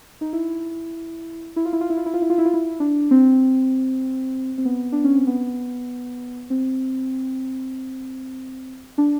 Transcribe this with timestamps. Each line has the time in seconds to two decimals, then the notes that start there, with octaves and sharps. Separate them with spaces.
0.21 D#4
0.33 E4
1.56 E4
1.65 F4
1.73 E4
1.81 F4
1.90 E4
1.97 F4
2.06 E4
2.14 F4
2.22 E4
2.30 F4
2.38 E4
2.46 F4
2.54 E4
2.80 D4
3.11 C4
4.58 C4
4.65 B3
4.92 D4
5.04 C#4
5.15 C4
5.27 B3
6.50 C4
8.98 D4